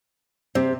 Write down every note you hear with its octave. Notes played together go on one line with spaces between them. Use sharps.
C3 C4